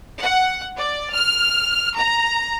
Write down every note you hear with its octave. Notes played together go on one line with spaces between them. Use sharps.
F#5
D5
F6
A#5